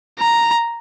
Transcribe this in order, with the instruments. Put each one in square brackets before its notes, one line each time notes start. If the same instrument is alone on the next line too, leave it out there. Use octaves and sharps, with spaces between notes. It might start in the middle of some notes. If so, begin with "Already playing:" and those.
[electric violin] A#5